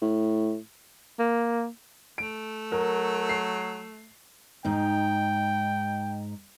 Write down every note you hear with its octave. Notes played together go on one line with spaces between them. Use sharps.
A2
A#3
A3 D7
F#3 A#4
C7
G#2 D#4 G5